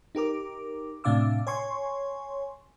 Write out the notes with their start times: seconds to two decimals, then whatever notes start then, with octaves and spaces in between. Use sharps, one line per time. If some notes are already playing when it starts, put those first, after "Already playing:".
0.15 D#4 G4 A#4 D6
1.04 A2 C3 D4 F5 D6 E6
1.47 C#5 G#5 C6 C#6